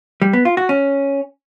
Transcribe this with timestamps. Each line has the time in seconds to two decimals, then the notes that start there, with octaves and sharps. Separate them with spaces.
0.22 G3
0.33 B3
0.45 F4
0.57 F#4
0.69 C#4